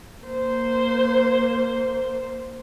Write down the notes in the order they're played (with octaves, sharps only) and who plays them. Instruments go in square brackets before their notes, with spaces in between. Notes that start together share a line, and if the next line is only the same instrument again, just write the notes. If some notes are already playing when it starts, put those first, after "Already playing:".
[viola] A#3 C5